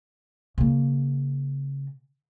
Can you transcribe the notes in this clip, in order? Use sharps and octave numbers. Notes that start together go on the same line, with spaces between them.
C#3 A#3